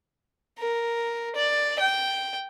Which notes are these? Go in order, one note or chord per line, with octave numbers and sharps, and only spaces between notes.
A#4
D5
G5